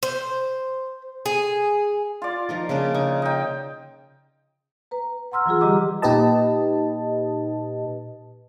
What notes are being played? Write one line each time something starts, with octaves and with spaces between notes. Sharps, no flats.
C5
G#4
F4 D5
F3 D#4 A#4
C#3 A#3 D4
C#3 D#4 C#6
D#4 G5
B4 A#5
F#5 A#5 C6 E6 F6
E3 F#3 F4 G#4
D3 G3 G4 D#5 A#5 D6
A#2 D#4 G4 B4 D#5 A5